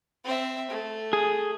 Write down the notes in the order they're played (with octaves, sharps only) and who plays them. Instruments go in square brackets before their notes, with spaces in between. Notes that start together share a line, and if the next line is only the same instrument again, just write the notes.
[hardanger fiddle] C4 E5
A3
[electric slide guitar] G#4